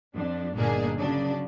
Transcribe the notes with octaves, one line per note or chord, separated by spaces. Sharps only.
F2 D4
G1 A#2 A#3 D4 D#4 G#4
C#3 F#3 D4